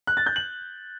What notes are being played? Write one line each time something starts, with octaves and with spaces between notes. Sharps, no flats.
F#6
A6
G6
F#7